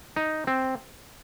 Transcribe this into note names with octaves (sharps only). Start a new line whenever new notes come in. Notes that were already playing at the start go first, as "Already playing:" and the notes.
D#4
C4